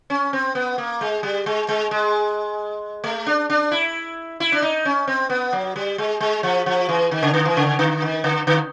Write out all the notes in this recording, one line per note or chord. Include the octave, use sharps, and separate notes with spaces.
C#4
C4
B3
A#3
G#3
G3
G#3
G#3
G#3
A3
D4
D4
E4
E4
D4
D#4
C#4
C4
B3
F#3
G3
G#3
G#3
F3
F3
E3
D#3
C#3
D3
E3
C#3
D3
D#3
D3
D3